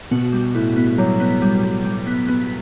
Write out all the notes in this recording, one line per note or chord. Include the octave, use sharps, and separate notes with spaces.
B2 F#4
G3
A2 B3
B3
F#3 G3
B3
G3
G3
G3
B3
B3